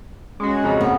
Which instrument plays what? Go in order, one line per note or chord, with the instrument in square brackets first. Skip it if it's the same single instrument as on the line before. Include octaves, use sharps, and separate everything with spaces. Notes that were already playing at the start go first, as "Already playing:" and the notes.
[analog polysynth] G#3 F#4 [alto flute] C#4
[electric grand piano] F2 C#3 A#5
[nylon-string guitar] B3